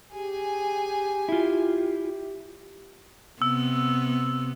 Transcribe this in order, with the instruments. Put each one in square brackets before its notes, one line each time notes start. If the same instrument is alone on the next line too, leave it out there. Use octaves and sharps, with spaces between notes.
[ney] G4 [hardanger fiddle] G#4 G#5
[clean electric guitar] E4 F4
[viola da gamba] C3 B3 [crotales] E6